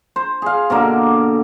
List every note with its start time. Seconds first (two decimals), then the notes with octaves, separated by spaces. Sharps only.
0.16 C5
0.42 G#4 F5
0.70 B2 D3 A#3